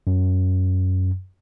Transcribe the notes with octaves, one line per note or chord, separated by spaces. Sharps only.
F#2